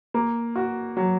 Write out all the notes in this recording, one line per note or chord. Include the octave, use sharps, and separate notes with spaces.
A#3
F#4
F#3